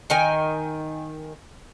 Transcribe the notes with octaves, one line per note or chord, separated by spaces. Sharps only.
D#3 D#4 G5 G#5